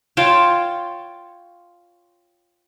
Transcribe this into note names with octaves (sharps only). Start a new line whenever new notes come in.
F4 C#5 G5 A5